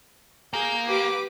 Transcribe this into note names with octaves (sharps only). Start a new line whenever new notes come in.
A#3 G#4 G6
G4 B4 D6